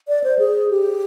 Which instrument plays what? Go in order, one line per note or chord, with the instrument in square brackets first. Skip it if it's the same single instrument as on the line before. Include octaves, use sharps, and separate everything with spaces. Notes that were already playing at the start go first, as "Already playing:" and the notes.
[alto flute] D5
C5
G#4
G4